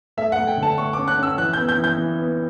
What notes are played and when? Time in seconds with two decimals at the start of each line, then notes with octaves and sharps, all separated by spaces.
0.17 A3 E5
0.32 F#5
0.38 A3
0.47 G5
0.57 D3
0.63 A5
0.77 A3 C#6
0.93 D6
0.98 C#4
1.08 F#6
1.18 C#4 E6
1.38 E3 F#6
1.53 G6
1.57 B3
1.69 G6
1.78 E3
1.84 G6
1.98 E3
2.18 B3